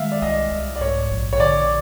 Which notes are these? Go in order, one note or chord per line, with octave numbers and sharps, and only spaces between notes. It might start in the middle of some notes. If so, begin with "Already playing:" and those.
Already playing: D#3 G#3 E5 F5
D5
C2 D#5
C2
D5
G#2 C#5
A#1
C#5
D3 D5